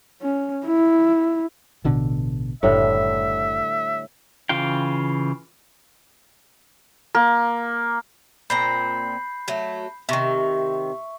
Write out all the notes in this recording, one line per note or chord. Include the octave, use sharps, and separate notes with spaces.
C#4
E4
A1 B2 D3
F#1 A2 D3 G3 E5
C#3 E3 F4 F5 G5
A#3
A#2 C4 A#5 B5 G6 C7
F#3 A3
C3 D#3 E5 C#6